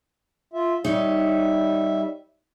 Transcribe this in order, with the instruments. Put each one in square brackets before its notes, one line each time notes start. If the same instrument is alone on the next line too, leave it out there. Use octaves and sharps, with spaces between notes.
[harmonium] F4 E5
[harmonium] G3 E5 [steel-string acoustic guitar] D#4 C#5